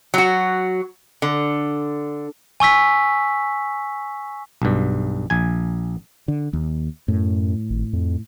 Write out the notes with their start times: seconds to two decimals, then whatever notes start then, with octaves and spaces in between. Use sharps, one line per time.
0.14 F#3 F#4
1.22 D3
2.60 G#5 C#6 E6 B6
4.62 B1 G2
5.30 A#1 G#5
6.28 D3
6.53 D#2
7.08 F#2 A2
7.70 G#1
7.93 F2